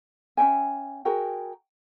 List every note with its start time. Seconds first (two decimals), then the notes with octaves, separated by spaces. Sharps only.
0.37 C#4 E5 G5 G#5
1.05 F#4 G#4 A#4 G5